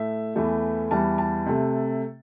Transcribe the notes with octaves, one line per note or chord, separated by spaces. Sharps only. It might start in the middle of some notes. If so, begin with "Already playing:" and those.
Already playing: A2 A3 E5
E2 E3 A3
E2 E3 G3 A5
A5
C3 A3